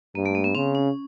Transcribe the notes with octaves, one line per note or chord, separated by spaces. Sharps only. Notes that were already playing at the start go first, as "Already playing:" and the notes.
G2 A#3
A3
A#3
B3
C#3 C4
C#4